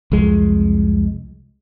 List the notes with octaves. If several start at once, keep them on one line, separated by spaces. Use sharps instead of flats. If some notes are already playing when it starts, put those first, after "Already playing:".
C2 F2 G#3